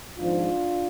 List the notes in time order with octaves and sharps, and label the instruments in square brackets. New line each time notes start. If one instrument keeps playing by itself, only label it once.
[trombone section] G#1 G#2 F3 D4 F4